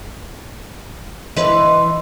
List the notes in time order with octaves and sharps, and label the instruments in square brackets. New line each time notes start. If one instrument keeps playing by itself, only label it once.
[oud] E3 E4 B4 [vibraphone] D#5 C6